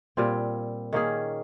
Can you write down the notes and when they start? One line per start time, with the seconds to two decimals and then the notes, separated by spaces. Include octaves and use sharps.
0.17 A#2 G3 C4 F4
0.93 D#3 A#3 C#4 G#4